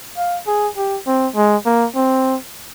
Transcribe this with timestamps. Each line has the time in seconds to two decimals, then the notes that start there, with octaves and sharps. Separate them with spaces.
0.17 F5
0.47 G#4
0.77 G4
1.07 C4
1.36 G#3
1.66 A#3
1.95 C4